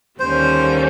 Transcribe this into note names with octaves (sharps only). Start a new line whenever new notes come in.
D#2 D3 G3 A#3 C#4 C5